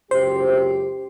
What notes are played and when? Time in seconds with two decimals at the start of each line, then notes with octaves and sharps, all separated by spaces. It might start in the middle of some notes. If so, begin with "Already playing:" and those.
0.11 C#2 F#2 G4 C5